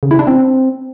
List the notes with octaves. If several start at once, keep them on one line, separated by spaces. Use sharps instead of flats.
C#3
E4
D4
C4